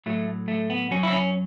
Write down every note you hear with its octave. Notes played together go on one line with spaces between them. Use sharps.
A2 F#3 A3
A3
B3
F#2 F#3 C#4
E4
C#4